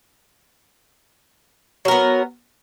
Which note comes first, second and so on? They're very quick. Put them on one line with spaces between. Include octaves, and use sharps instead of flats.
F#3 A#4 B3